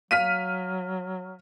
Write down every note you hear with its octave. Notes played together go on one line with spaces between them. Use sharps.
F#3 F5 F6 B6 D#7